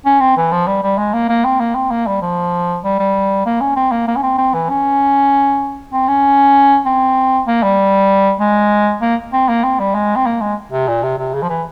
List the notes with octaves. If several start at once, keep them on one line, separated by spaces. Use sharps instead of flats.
C#4
C4
E3
F3
G3
G3
G#3
A#3
A#3
C4
A#3
C4
A#3
G3
F3
G3
G3
A#3
C#4
C4
A#3
A#3
C#4
C4
C4
E3
C#4
C4
C#4
C4
A#3
G3
G#3
A#3
C4
A#3
C4
G3
G#3
C4
A#3
G#3
C3
A#2
C3
C3
C#3
F3
E3